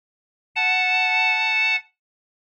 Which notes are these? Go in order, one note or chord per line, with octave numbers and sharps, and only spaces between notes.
F#5 A5